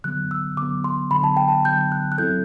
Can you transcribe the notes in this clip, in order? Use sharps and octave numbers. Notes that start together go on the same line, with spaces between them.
D3 F#3 B3 F#6
E6
D3 F#3 B3 D6
C6
D3 F#3 B3 B5
A5
G5
A5
D3 F#3 B3 G6
F#6
F#6
F#3 C4 E4 A4 G6